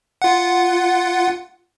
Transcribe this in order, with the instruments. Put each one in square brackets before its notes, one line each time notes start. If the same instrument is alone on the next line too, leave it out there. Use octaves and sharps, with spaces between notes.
[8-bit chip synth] F4 F#5